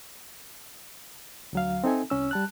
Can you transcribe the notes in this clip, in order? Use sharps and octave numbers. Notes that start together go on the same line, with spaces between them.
D2 F#3 F5
C4 D#4 A4 E5 G#5
C2 C#4 E6
G3 A5 F#6